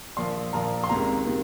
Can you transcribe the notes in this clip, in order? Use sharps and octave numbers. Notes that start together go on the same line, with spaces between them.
A#1 A#2 F3 C6
A#1 A#2 F3 A#5
C6
C#2 C3 D#3 A#5
C3 D#3